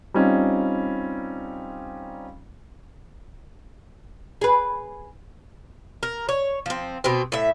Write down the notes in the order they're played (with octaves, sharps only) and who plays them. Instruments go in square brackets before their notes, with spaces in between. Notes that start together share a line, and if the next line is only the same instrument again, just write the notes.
[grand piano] G3 C4 C#4 D#4 F4
[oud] G#4 B4
[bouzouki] A#4
C#5
F3 C4
B2 C4
A2 E5